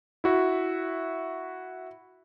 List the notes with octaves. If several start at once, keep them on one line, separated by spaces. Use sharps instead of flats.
E4 F#4 E5